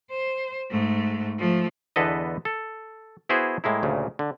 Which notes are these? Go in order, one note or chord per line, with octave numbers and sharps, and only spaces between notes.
C5
G#2 A3
F3 A3
E2 D3 B3 A4 B4 D#5
A4
B3 E4 F#4 G#4 C5
A2 G#3 A#3 E4
D2 A#2 C#3
D3